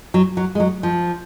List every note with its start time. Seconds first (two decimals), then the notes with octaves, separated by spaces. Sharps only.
0.14 F#3
0.37 F#3
0.55 G#3
0.60 F#3
0.83 F3